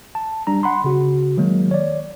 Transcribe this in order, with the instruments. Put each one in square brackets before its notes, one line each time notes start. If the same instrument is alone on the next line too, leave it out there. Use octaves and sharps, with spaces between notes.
[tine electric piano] A5
G3 D4 A#5
F#5 B5 C6
C#3 F#4
D#3 F#3 G#3 A#3
C#5 D5